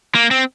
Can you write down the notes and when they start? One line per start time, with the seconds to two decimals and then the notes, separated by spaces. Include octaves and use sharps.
0.15 A#3
0.31 C4